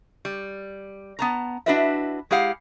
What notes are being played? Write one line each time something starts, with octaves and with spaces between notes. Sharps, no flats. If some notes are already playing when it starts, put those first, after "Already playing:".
G3
B3 A5 A#5
D4 E4 F#4 B4 D#5 E5
G#3 E4 G4 F5 F#5